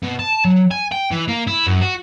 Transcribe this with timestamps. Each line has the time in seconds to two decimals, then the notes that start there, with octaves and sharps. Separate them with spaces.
0.03 B2
0.19 A5
0.45 F#3
0.71 G#5
0.92 G5
1.11 E3
1.28 A#3
1.47 E4
1.67 F#2
1.82 F#4